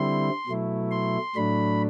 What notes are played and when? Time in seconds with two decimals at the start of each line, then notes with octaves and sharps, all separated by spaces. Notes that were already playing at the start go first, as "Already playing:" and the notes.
Already playing: D3 G3 C4 E4 C6
0.47 B2 F#3 A3 E4
0.91 C6
1.36 A2 F#3 A3 D4 B5